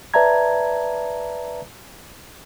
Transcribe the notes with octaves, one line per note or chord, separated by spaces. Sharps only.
B4 D5 E5 A5 A#5 G#6